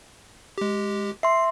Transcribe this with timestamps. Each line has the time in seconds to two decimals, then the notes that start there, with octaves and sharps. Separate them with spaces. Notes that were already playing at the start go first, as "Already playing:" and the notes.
0.58 G#3 G4
1.23 E5 C6 C7